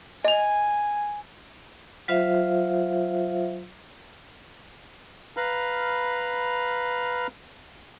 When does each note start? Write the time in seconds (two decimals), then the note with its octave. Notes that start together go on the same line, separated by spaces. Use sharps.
0.25 D#5 G#5 F7
2.08 F#3 F4 C5 E5 F5
5.37 B4 F5 A#5 B5 F6